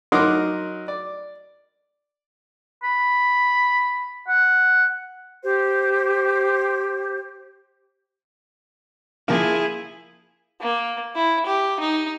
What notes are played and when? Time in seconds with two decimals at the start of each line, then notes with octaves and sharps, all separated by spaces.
0.12 F#3 D#4 A#4 F#5 C6 D6
0.88 D5
2.83 B5
4.28 F#5
5.43 G4 C5
9.28 F3 A#3 E4 G#4
10.61 A#3
11.15 E4
11.46 G4
11.80 D#4